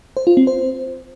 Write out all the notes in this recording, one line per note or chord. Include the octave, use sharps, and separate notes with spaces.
C5
F4
C4
C5